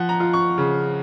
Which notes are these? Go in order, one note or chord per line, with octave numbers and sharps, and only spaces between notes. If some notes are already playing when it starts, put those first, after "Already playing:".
Already playing: F3 F#5
A#5
F4
C#6
C#3